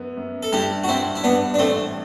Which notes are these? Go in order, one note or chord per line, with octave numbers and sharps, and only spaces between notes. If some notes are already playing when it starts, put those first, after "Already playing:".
Already playing: F#2 B3
F#2
A4
G2 E4 G4
F#4
G2 C4 E4
E4
G2 B3 D4
D4
A1 A3 C4